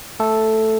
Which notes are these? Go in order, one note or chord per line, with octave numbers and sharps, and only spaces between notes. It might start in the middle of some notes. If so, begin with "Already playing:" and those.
A3 A4